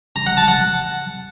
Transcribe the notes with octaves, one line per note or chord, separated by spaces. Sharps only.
A#5
F#5
A5
F#5